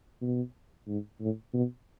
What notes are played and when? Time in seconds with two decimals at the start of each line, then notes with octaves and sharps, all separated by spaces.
0.21 B2
0.88 G#2
1.20 A2
1.54 B2